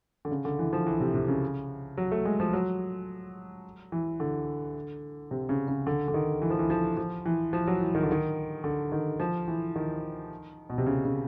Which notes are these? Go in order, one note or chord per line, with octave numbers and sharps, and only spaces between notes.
D3
C#3
D3
E3
F3
E3
C3
C3
C#3
F#3
A3
G#3
F3
F#3
E3
D3
C3
C#3
C#3
D3
D3
D#3
E3
F3
E3
F3
F3
E3
F3
F#3
E3
D#3
D3
D#3
D3
D#3
F3
E3
D#3
B2
C3
C#3
C#3